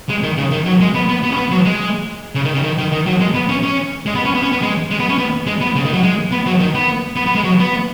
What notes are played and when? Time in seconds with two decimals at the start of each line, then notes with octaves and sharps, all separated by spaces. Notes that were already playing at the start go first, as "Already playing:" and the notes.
0.09 G#3
0.23 D#3
0.37 C#3
0.51 D#3
0.66 F#3
0.81 G#3
0.94 B3
1.09 B3
1.23 B3
1.32 C#4
1.37 B3
1.51 F#3
1.65 G#3
2.35 C#3
2.45 D#3
2.54 C#3
2.63 D#3
2.79 D#3
2.92 D#3
3.06 F#3
3.20 G#3
3.34 B3
3.49 C#4
3.63 C#4
4.06 G#3
4.15 B3
4.25 C#4
4.34 B3
4.43 C#4
4.52 B3
4.62 G#3
4.91 G#3
5.00 B3
5.09 C#4
5.18 B3
5.46 G#3
5.61 B3
5.75 C#3
5.85 D#3
5.94 F#3
6.03 G#3
6.32 B3
6.46 F#3
6.60 D#3
6.75 B3
7.16 B3
7.26 B3
7.35 G#3
7.44 F#3
7.59 B3